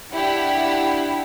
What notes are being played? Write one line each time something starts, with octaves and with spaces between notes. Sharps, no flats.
D4 E4 G4 F#5